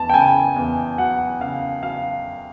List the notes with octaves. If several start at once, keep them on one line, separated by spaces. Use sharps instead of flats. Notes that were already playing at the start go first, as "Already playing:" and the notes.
Already playing: E2 A5
G5
C#3 G#5
E2
F#3 F#5
C#3 F5
F#3 F5